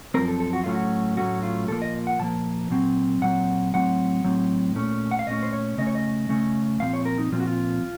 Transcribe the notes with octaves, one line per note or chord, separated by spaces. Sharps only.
F#2 F3 C4 A#4
A4
A4
F#4
A2 F#3 A3 C#4 F4
F#4
A2 F#3 A3 C#4 F#4
F4
A#2 F3 A#3 A4
D#5
F#5
A#2 F3 A#3 A5
A#2 F#3 C4
A#2 F#3 C4 F#5
A2 F#3 C4 F#5
A2 F#3 C4
A#2 A3 C#4
F#5
F5
A#2 A3 C#4 D#5
C5
C#5
C#3 A3 C#4 D#5
C#5
D#5
C#3 A3 C#4
A#2 F3 C4 F5
C#5
A#4
D#4
A#2 F3 C4 F4
F#4
F4